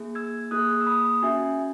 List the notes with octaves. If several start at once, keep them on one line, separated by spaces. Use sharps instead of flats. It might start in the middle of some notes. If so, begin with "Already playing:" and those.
Already playing: A#3 E4 G#4
E6 G#6
A#3 E4 G#4 D#6 F#6
E6
B5 D#6
C#4 F#4 E5 G#5